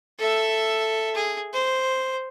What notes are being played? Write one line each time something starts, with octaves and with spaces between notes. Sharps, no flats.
A4 E5
G#4
C5